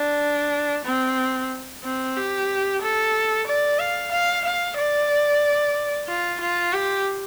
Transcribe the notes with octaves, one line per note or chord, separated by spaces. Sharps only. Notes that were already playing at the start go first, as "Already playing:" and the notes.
Already playing: D4
C4
C4
G4
A4
D5
F5
F5
F5
D5
F4
F4
G4